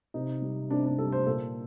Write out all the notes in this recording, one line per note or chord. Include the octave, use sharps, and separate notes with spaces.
C3 D#4
G3
C3 D4
D4
G3 A4
C5
A#2 A4